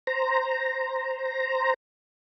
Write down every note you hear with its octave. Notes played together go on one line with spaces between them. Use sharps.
C5 A#5